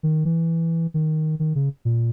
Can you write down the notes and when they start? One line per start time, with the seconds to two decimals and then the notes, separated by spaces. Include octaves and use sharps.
0.03 D#3
0.25 E3
0.94 D#3
1.39 D#3
1.55 C#3
1.85 A#2